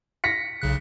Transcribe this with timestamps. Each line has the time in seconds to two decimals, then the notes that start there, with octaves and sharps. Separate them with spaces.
0.24 A#6 B6 C#7
0.62 B1 C#3 F#6